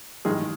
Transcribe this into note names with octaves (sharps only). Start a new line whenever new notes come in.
A1 G2 D#3 G#3 G#4